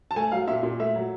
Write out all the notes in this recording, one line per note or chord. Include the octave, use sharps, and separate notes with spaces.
A5
A3 G#5
F#3 F5
A#2 E5
A#2
A3 E5
F#3